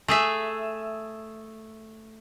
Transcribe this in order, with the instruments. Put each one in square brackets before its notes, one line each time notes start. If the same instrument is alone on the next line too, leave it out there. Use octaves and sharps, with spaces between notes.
[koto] A3 G#4 E5